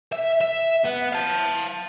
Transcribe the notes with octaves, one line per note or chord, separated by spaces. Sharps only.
E5
E5
B3
F5 A5